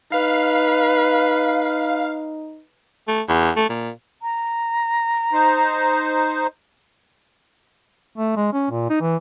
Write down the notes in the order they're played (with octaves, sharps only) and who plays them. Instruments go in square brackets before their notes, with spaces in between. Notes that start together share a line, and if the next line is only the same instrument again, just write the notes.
[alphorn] D#4 [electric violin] B4 [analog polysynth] F5
[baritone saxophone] A3
E2
A3
A#2
[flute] A#5
[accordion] D#4 C5
[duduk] A3
G#3
C#4
A#2
D#4
E3